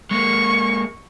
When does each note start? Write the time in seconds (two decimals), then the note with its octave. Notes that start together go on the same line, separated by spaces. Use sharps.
0.11 G#3 A#3 C#6